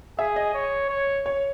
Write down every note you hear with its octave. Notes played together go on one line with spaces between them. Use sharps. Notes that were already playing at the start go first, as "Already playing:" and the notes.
G#4 E5
D#5
C#5
C#5
C#5